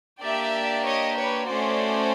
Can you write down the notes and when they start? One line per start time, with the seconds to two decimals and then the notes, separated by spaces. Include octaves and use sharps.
0.21 A#3 D4 G4 D5 E5
0.85 C#5 D#5
1.17 B4 C#5
1.48 A3 C#4 F#4 C5 D5